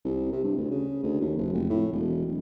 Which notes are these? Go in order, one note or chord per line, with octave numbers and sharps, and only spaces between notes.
C2
C3
G2
D2
C#3
D2
D#2
F#1
F1
A2
E1
D1